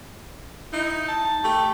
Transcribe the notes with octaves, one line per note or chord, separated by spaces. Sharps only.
D#4 E4
A5
A3 G4